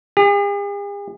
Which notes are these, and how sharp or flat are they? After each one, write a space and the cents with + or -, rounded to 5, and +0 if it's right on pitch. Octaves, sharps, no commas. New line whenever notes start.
G#4 -45